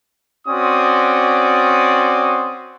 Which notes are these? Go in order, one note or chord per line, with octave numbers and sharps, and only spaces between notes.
C4 C#4 F#4 D5 C6 D#6